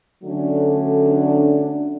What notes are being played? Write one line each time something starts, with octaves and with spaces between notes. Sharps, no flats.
D3 F#3 A3 C#4 D4